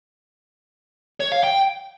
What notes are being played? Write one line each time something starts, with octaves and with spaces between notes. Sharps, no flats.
C#5
F5
G5